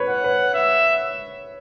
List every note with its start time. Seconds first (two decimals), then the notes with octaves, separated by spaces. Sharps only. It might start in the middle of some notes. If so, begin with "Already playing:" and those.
Already playing: B4 C#5
0.09 F#5
0.24 B4
0.54 E5